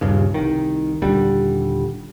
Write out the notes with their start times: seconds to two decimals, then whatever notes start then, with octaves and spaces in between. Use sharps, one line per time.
0.01 D#1 G2 C#3
0.34 C2 D#3
1.02 D#1 D3 G3